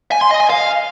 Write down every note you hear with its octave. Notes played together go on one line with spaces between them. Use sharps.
G#5
C6
D#5
G#5
F5